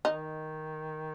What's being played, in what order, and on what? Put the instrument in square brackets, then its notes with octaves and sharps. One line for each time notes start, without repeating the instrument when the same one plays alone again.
[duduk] D#3 [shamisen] D#4